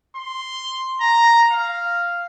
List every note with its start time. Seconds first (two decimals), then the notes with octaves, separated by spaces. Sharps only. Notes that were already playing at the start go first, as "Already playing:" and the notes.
0.16 C6
1.00 A#5
1.51 F5